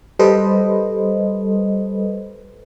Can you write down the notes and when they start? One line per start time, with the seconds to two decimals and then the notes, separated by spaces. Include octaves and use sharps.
0.19 G3 A4 B4 C5 D#5